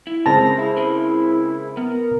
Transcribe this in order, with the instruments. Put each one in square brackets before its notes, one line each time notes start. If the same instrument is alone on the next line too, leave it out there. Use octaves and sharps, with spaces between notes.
[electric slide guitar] E4
[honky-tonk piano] C#3 G#3 C4 [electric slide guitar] A#4 [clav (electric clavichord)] A5 [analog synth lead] A#6
[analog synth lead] E4
[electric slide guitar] G#4 A#4
[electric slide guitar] B3 [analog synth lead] A#4